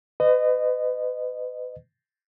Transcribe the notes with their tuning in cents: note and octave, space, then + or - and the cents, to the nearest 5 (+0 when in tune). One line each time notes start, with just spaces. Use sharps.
B4 +35 D#5 -20